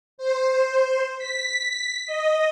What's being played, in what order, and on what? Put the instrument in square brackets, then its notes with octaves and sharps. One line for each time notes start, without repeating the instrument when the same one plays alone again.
[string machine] C5
B6
D#5